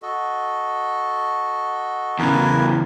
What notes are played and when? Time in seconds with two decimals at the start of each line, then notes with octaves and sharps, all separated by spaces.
0.02 F#4 A4 D#5
2.19 E2 C#3 A#4 B4 G#5